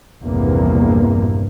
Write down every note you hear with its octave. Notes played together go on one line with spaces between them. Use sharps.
A#1 E2 G2 C3 A#3